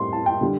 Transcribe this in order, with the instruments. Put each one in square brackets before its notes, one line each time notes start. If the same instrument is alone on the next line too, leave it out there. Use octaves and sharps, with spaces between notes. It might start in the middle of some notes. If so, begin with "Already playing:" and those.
Already playing: [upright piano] A2 G3 C4 C6
A5
G5
D3 G3